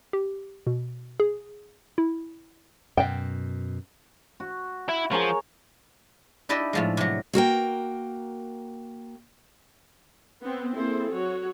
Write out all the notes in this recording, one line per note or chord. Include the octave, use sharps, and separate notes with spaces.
G4
B2
G#4
E4
F#2 B2 G5
F#4
E4
F3 G#4 A#4 C#5
D4 E4 G4 D5 D#5
A2 F3 G#3
C3 F#3
A#3 F#4 A#4 G5
B3 C4
A#3 C4 E4 G#4 A4 C5
F#3 F#4 C#5